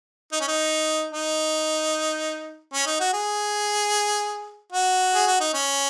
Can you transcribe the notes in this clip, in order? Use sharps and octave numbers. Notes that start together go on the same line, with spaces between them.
D#4
C#4
D#4
D#4
C#4
D#4
F#4
G#4
F#4
G#4
F#4
D#4
C#4